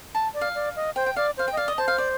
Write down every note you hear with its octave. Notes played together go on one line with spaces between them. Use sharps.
A5
D5
F5
D5
D#5
C5 G5
G5
D5 F5
C5 F5
G5
D#5
D5 F5
D#5
C5 A5
F5
D5